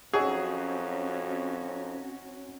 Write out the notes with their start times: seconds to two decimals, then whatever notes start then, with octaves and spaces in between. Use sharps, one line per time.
0.13 F2 F#3 C4 C#4 D#4 F#4 G#4 E6